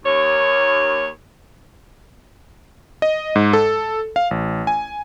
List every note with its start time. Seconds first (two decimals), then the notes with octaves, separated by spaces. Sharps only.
0.05 D#2 C#5
3.02 D#5
3.36 G#2
3.53 A4
4.16 F5
4.31 A1
4.67 G#5